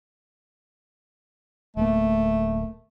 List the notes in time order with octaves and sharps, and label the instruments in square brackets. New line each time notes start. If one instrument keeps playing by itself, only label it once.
[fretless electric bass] D1 A#3 [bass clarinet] A3